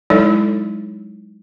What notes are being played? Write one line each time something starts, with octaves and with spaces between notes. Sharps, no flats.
F#3 G#3 D#4 E4 A4 C#5